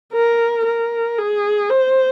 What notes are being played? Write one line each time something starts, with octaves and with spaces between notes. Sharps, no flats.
A#4
A#4
G#4
C5